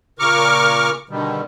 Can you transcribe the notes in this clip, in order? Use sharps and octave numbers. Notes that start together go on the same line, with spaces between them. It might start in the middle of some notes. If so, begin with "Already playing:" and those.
A#2 C#3 A#4 C#6 D6 F6
B2 D3 D#3 G3